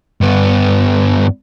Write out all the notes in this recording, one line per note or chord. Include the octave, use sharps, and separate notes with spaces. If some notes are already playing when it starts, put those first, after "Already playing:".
G2 B3